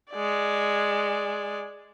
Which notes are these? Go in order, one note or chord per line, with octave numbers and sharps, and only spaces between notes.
G#3 D5